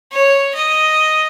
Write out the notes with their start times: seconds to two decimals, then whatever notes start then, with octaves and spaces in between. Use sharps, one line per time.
0.12 C#5
0.55 D#5